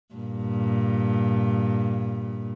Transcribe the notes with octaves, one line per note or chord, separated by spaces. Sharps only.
G2 A#2